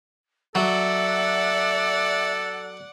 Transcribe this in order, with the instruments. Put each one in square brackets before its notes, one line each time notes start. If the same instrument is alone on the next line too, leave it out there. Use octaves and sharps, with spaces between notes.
[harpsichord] F#3 [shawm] A4 [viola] D5 F#5 [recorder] E5